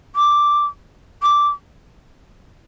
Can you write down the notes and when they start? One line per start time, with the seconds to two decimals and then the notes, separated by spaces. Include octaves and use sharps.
0.16 D6
1.23 D6